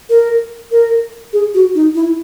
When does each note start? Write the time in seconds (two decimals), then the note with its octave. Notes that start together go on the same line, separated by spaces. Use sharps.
0.10 A#4
0.72 A#4
1.33 G#4
1.54 F#4
1.75 D#4
1.95 E4